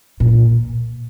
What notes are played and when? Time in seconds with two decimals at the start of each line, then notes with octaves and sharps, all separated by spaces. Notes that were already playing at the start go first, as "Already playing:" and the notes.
0.20 A#2